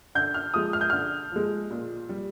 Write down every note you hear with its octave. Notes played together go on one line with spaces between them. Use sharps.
D3 G6
F6
F3 G#3 D#6
F6
G6
D3 F6
F3 G#3
A#2
G3